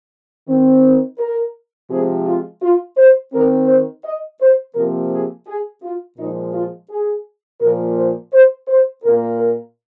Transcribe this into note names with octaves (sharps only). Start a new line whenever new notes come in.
D#3 C4
A#4
C3 F3 G#3 C4 G#4
F4
F4
C5
D#3 C4 A#4
C5
D#5
C5
C3 F3 A#3 A#4
G#4
G#4
F4
A#2 F3 G#3 D#4
F4
G#4
A#2 F3 A#3 A#4
C5
C5
C5
A#2 A#3 A#4
A#4